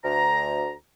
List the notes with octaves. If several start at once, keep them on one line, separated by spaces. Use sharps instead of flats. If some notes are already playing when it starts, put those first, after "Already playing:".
D2 A#5